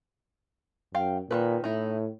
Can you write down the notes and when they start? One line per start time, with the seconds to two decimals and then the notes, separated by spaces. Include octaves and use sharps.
0.95 F#2 F5 G5
1.31 A#2 D#3 A3 B4
1.64 A2 D#4 E4